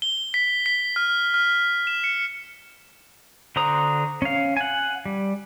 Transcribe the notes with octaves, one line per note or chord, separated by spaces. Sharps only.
G7
B6
B6
F6
F6
E7
C#7
D3 F#4 C5 A#5 D#6
C#4 F5
F#5 G#5
G3